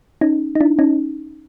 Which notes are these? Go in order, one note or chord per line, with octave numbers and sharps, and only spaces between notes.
C#4 D#4
D#4
D4 E4
C#4 D#4